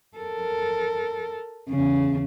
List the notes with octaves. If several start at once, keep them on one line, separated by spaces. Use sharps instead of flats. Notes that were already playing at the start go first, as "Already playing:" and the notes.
A4 A#4
E2 C#3